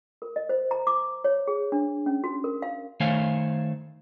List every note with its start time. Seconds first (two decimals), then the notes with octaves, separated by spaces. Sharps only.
0.22 A#4
0.36 D#5
0.49 C5
0.71 A#5
0.87 D6
1.24 C#5
1.48 G#4
1.72 D4
2.06 C#4
2.24 F#4
2.44 A#4
2.62 F5
3.00 D#3 A3 C5 C#5 F5 G#5